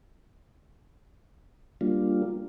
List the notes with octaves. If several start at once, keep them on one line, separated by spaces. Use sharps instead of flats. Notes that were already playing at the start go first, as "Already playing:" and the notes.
G3 A#3 D4 F4